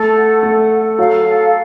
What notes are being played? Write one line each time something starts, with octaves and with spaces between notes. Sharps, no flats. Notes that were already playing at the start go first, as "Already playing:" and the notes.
Already playing: A3 A4
F#5
A3 A4
A4
F#3 F5
A4